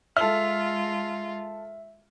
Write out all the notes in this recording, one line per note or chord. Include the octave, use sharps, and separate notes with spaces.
G#3 F4 A4 E5 F6